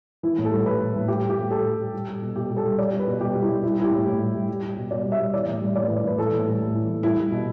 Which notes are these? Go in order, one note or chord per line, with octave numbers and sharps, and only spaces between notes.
E3 E4
A2
A4
G3
A2 B4
E3
A2
G3 G4
G3
G4
A2
A2 A4
G3
G3
G3
G3
B2
B2 G4
G3
A4
G3
G3 D5
G3
B4
B2
B2 G4
G3
E4
G3
G3 E4
G3 E4
G4
A2
A2
G3
G3
G3
G3
B2
B2 D5
G3
E5
G3
E3 D5
A2
G3
A2 D5
B4
E3
D5
A2 B4
E3 A4
A2
G3
A2
E3
A2
G3 E4
G3
B2